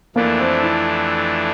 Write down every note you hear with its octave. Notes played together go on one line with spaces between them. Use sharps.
F2 E3 A3 A#3 D4
C4
E4